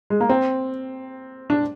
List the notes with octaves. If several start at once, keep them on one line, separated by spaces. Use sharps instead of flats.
G#3
A#3
C4
D4